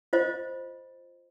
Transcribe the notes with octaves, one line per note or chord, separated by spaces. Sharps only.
F4 C5 D#5